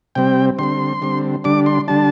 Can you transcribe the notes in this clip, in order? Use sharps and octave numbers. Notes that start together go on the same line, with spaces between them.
C3 G3 C4 G5
D3 G3 C4 C6
D3 G3 C4
D3 G3 D4 D6
C6
D3 G3 D4 A5